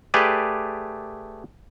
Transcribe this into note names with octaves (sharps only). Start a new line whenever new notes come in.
A3 G4 G#4 B4 D5